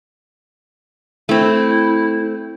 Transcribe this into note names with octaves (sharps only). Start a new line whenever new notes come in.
A3 C4 E4